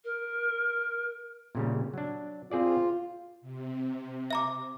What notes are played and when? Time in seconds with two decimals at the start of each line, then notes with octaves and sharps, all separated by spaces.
0.04 A#4
1.55 A#2 C#3 G3
1.94 F#3 D4
2.51 C4 F4 G#4 D5
3.41 C3
4.31 E5 A#5 D6